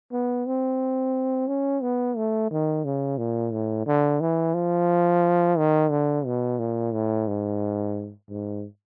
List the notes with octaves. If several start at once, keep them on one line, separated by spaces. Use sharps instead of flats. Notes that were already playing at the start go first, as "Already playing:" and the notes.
B3
C4
C#4
B3
A3
D#3
C#3
A#2
A2
D3
E3
F3
D#3
D3
B2
A#2
A2
G#2
G#2